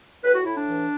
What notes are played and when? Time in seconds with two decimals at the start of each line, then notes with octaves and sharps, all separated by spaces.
0.24 A2 B4
0.34 F#4
0.45 A2 E4
0.56 D4
0.67 E3